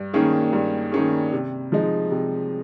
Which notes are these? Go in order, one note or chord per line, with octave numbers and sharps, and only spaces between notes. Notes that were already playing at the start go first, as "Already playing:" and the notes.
Already playing: G2
D#3 A#3 C#4 G#4
G2
D#3 A#3 C#4 G#4
C3
F3 G#3 D#4
C3